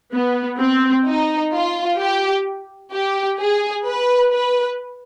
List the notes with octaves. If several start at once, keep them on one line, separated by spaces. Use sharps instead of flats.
B3
C4
D#4
F4
G4
G4
G#4
B4
B4